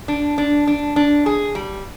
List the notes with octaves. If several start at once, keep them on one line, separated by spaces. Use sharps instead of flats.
D4
D4
D4
D4
G#4
G3